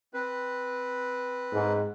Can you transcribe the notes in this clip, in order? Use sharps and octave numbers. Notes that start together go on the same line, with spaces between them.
C4 B4
G#2